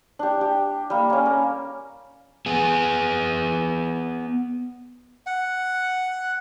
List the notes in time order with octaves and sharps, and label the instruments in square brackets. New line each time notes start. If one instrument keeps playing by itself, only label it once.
[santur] D4 G4
G4
G3 A#3
A#3 C#4
A#4
[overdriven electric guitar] B3 G#4
[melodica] F#5